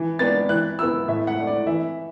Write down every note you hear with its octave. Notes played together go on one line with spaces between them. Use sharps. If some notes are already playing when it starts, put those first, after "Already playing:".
Already playing: E3
B3 D4 A6
E3 F#6
B3 E4 E6
A2 E5
F#5
A3 D4
D5
E3 E5